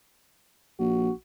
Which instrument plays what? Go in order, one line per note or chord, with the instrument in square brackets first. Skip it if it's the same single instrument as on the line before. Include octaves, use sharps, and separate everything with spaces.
[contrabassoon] A#1 [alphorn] F#4